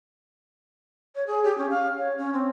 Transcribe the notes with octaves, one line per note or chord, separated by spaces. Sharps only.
C#5
G#4
G4
C#4
F5
C#5
C#4
C4